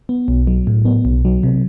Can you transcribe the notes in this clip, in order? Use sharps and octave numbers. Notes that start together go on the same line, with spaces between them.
B3
B1
F#3
A2
B3
B1
F#3
C3